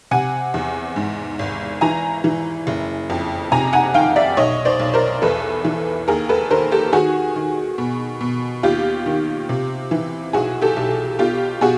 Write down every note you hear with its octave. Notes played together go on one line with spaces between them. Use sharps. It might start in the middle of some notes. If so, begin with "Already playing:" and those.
C3 F#5 G#5
E2
G#2
G#1
E3 G#5 A#5
E3
F#1
F2
C3 G#5 A#5
F#5 G#5
D#3 F5 G5
D5 E5
B1 C#5 D#5
C5 D5
B1
A#4 C5
E2 A4 B4
E3
D#2 G#4 A#4
A4 B4
D#3 A#4 C5
G4 A4
D#3 F#4 G#4
D#3
B2
B2
D#2 F4 G4
D#3
C3
E3
B1 F#4 G#4
G4 A4
B1
B2 F4 G4
B2 F#4 G#4